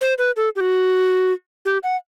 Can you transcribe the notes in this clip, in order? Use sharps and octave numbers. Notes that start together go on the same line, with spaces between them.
C5
B4
A4
G4
F#4
G4
F#5